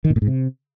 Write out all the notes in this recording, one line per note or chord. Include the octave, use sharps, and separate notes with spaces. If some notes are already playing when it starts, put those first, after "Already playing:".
D#3
A#2
A2
G#2
C3